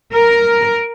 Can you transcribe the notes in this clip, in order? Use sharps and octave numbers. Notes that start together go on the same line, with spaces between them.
A#4